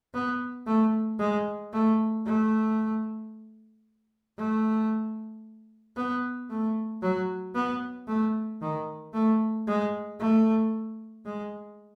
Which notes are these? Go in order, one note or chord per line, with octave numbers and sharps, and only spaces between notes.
B3
A3
G#3
A3
A3
A3
B3
A3
F#3
B3
A3
D#3
A3
G#3
A3
G#3